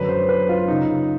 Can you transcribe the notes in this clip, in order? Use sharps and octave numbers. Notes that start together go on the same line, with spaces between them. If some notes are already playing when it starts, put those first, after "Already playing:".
Already playing: F#2 D3 F#3 B4
C5
B4
F4
C#3 D#4